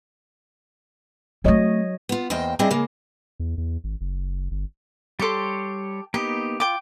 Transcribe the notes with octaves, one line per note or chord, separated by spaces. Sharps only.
F#3 A3 C4 C#5 D#5
B3 F4
E2 A#3 C5 D#5 G5
G3 C4 D4 E4 G#4 D#5
C#3 G#3 A#3
E2
E2
G#1
F#1
G1
G3 G4 A4 C#5 C6
A#3 B3 D#4 G4
F4 G5 D6